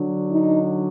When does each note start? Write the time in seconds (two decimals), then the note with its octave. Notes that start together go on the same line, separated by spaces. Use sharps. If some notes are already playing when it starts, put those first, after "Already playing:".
Already playing: D3 F#3 D4
0.31 D#4